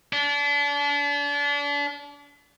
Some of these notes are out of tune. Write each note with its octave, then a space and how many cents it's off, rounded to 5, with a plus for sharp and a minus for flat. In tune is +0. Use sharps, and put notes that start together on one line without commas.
D4 -35